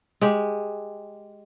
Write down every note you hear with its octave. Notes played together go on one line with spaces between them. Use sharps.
G#3 G4